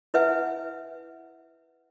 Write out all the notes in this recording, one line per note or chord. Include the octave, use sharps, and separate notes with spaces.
E4 B4 E5 F#5 G#5